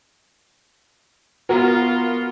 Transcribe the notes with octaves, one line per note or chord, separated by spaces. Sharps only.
B3 F4 F#4 A#4